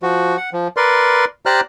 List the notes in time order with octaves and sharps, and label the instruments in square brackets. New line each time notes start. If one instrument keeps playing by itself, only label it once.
[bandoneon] F3 F#4
F#5
F3
A#4 B4 D5 C6
G4 C5 D5 A#5 F6 F#6